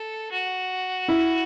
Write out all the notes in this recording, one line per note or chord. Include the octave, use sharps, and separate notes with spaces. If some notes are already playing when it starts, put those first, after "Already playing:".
Already playing: A4
F#4
E4